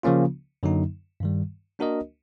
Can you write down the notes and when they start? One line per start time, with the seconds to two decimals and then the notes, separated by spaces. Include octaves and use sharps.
0.03 C#3 F3 A#3 C#4 F4
0.63 F#2 D3 F#3 A#3 D#4
1.20 G2 D#3 G3
1.79 A#3 D4 F#4 A#4 D#5